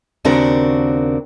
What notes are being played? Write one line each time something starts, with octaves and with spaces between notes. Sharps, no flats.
D#2 C#3 C4 D4 F#4 A#4